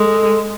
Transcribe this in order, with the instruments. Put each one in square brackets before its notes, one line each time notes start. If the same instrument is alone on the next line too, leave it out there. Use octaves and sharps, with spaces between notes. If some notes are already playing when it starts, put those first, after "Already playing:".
Already playing: [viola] G#3 [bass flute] A4